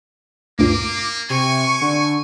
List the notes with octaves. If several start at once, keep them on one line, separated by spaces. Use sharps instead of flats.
D2 G2 A#2 A#3 D6
C3 G#5 C#6
D3